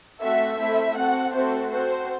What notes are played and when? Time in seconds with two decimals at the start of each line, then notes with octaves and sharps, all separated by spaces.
0.21 A3 C4 F#4 A4 E5
0.58 A3 C4 E4
0.96 C4 F#4 A4 F#5
1.33 A3 C4 F#4 A4 C5
1.70 C4 F#4 A4 C5